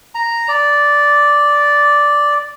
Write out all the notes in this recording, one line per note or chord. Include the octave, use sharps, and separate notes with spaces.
A#5
D5